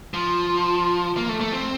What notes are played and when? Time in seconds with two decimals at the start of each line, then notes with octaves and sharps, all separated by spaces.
0.14 F3
1.17 A#3
1.29 A3
1.41 A3
1.52 C4